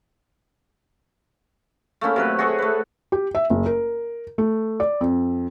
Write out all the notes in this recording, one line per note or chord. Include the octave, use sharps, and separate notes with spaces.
A3 A#3 C#4 E4
C3 F#3 B4
F#4 G#4 A4 C#5
A3 B4
G4
E5
F#1
A#4
A3
D5
F2